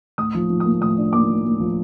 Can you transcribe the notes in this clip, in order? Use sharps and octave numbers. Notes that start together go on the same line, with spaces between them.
A2 D#6
F3
F3
D#6
A#3
A2 D#6
D4
A#3 D6
A2
A#3
F3